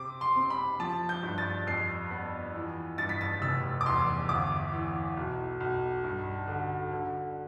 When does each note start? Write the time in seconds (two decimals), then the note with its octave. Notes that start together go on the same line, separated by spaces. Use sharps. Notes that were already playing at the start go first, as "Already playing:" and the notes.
Already playing: C3 C4 D6
0.21 C6
0.36 C4
0.50 B5
0.80 F3 A5
1.09 G6
1.23 G2
1.38 A6
1.67 F2 C7
2.11 B3
2.54 E3
2.98 G2 A6
3.09 B6
3.21 A6
3.42 F1 E6
3.81 D6
3.86 E2 C6
4.29 G1 D6
4.73 E3
5.17 B1
5.60 B1
6.04 G2
6.47 D3
6.91 D3